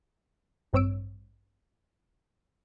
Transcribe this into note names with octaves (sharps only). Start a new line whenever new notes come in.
A1 G2 C4 C#5 E6 D7